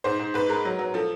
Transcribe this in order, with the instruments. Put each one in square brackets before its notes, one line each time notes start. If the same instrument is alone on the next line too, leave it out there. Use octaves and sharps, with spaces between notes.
[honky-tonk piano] G#2 C5
G#2
G#2 B4
G#3 A#4
F#3
F#3
F3 A4